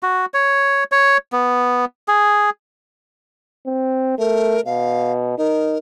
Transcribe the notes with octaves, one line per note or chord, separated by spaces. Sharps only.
F#4
C#5
C#5
B3
G#4
C4
A3 A#4
B2 F5
D#4 A#4